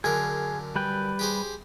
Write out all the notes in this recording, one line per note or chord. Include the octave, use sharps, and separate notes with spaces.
F#2 D3 G#4 A#4
G3 B4 G5
G4 G#4 C5